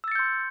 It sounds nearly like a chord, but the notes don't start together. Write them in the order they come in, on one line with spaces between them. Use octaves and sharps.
E6 A6 C#7 G6 C6